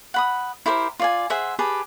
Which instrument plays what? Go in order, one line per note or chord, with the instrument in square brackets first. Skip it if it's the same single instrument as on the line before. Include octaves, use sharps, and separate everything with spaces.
[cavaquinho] F#5 B5 D#6
E4 G4 A#4 C5
F4 D5 G#5
G#4 C5 E5 F#5
G4 G#4 B4 A5